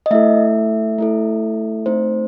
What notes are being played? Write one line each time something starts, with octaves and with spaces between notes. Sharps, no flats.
D#5
A3 E4 A4 E5
A3 E4 A4
A3 C4 D#4 C5